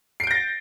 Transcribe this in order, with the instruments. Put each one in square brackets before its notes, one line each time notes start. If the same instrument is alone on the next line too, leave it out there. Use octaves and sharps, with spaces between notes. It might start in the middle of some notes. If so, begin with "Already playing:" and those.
[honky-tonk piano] C7
D7
G6
A#6
A6